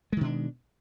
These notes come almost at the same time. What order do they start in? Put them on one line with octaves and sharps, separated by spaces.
G#3 D#3 B2 D4